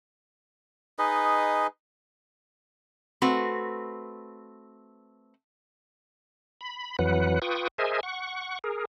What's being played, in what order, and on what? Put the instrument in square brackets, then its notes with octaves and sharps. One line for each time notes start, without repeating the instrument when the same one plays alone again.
[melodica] D#4 G#4 B4 D#5
[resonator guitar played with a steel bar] A3 C4 F#4 B4
[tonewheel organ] B5
F2 E3 F#3 B4 F#5
F4 B4 G5 C#6 D#6
G#4 A#4 C5 D#5 E5 G#5
F#5 C#6
G#4 A#4